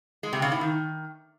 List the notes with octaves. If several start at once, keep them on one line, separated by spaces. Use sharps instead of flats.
G#3
C3
C#3
A2
D#3